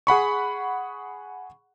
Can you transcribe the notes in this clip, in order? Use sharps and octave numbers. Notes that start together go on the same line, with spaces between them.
G#4 F#5 B5 C#6